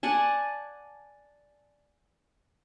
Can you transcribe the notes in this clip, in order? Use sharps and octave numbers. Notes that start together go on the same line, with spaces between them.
D5 F#5 G#5 A5